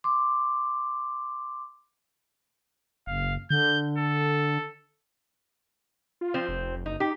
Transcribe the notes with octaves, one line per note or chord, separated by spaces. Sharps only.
C6 D6
F#1 F5
D3 G6
A4
F4
F3 C4
F1
F#1 D#4
D#4 G4